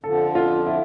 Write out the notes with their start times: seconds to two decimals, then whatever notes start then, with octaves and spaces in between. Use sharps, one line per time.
0.04 F2 D3 F3 A4
0.35 F4
0.67 E4